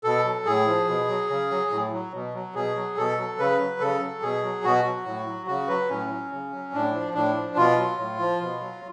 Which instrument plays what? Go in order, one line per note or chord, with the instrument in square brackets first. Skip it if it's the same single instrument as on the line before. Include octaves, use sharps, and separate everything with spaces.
[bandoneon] B2 A4
F#3
A2 G#4
F3
B2
F#3
C#3
F#3
A2
F#3
B2
F#3
B2 G#4
F#3
B2 A4
F#3
C#3 B4
F#3
C#3 A4
F#3
B2 G#4
F#3
B2 F#4
F#3
A2
F#3
C#3 F#4
F#3 B4
A2 C#4
F#3
C#3
F#3
A2 D4
F3
A2 D4
F3
B2 F4
F#3
A2
F3
B2
F#3